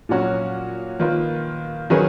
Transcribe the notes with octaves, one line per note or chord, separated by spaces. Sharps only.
A#2 F#3 C#4 F#4
D#3 A#3 F4 B4
D#3 F#3 C#4 G#4 B4